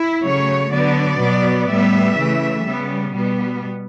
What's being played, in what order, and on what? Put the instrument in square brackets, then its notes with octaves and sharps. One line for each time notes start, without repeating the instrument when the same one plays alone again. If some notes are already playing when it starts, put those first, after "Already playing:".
Already playing: [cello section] E4
C#3 F#3 A3 C#5
D3 F#3 B3 D5
B2 F#3 B3
A2 G3 B3 E5
C#3 E3 A3
C#3 G3 B3
B2 G3 B3